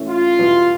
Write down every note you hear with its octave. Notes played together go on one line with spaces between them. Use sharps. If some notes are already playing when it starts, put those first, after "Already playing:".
Already playing: A2 E3 A3 C#4
F4
E2 B2 G3 B3